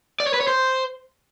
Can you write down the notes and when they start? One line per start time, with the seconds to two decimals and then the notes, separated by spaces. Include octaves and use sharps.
0.20 D5
0.27 C#5
0.34 B4
0.41 C#5
0.47 C5